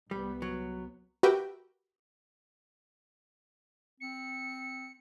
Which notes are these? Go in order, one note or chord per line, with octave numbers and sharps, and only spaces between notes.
C2 G3 B3
F#3
F#4 G4 A#4 B4 E5 G5
C4 C#7